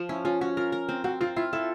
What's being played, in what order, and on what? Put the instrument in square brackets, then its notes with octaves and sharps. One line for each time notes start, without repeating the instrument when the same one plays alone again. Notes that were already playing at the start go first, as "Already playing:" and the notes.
Already playing: [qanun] F3
[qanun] C#4 [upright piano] E4
[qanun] C#4 [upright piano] F4
[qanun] C#4 [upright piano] F#4
[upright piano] F4 [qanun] A#4
[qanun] A#4
C4
[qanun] C4 [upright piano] F#4
[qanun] C4 [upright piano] F4
[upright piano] E4 [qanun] F4
[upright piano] E4 [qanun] A4